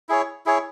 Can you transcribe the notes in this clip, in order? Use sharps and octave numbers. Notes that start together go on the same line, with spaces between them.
E4 G#4 C#5
E4 G#4 C#5